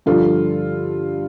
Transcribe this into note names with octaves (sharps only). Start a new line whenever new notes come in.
G2 D3 F3 F4 A4